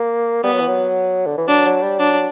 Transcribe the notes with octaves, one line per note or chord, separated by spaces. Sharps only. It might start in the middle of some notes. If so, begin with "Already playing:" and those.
Already playing: A#3
G3 B3
F#3
E3
F#3
D3
E3
F#3 D4
F#3
G3
F#3 D4